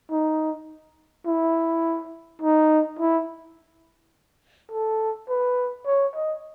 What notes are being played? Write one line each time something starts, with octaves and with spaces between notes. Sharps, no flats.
D#4
E4
D#4
E4
A4
B4
C#5
D#5